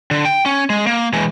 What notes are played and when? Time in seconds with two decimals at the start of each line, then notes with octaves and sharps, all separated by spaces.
0.11 D3
0.25 G5
0.46 C#4
0.70 G#3
0.87 A#3
1.13 E3 G#3